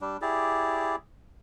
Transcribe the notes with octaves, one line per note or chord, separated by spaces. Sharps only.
G3 D4
E4 G4 G#4 D5